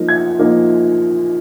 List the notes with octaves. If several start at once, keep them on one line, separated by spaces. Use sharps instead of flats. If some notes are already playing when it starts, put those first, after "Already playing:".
Already playing: F3 A#3 D#4
G#6
F3 A#3 D#4